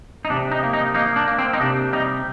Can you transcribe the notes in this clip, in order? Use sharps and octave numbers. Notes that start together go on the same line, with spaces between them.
D#4
C3 D4
D#4
A#3
D#4
A#3 D#4
D4
A#3
C4
D#4
C3 D4
G3 D#4